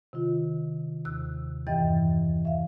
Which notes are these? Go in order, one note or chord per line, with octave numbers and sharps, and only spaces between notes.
C3 D#3 F4
D#2 C3 E6 F#6
E2 G2 E3 D#5 G5 A6
E5 F5